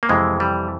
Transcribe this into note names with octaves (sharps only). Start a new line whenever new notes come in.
A#3
F2 C3 E3 G#3
G3